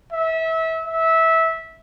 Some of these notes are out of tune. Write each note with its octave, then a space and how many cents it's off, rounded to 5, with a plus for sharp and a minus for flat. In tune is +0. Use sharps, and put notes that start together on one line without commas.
E5 -25
E5 -15